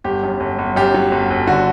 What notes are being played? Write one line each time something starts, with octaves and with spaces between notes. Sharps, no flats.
G1 G4
F#2
G1
G1
F#2 G4
F#3
G1
G1
D3 F#4